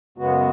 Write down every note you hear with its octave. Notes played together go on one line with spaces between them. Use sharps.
F#2 C#3 G#3 B3 F#4